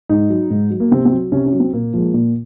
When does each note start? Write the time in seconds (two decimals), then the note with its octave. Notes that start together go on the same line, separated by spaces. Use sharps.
0.09 G#2 D#4
0.30 F#3
0.50 G#2
0.70 F#3
0.80 A#3
0.91 C3 C4
1.05 C4
1.12 F#3
1.32 C3 C#4
1.46 C#4
1.53 F#3
1.60 C4
1.73 A#2 A#3
1.94 F3 G#3
2.14 A#2